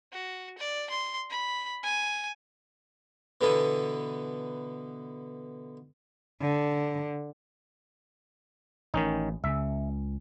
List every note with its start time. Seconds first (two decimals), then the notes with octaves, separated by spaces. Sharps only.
0.13 F#4
0.58 D5
0.90 C6
1.30 B5
1.83 G#5
3.41 B2 D3 E3 B3 A4 G#5
6.41 D3
8.94 A1 D#3 C#4 D#4
9.44 C#2 C#3 E5